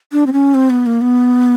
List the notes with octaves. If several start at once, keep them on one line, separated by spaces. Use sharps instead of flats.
D4
C4
C#4
C4
B3
A#3
B3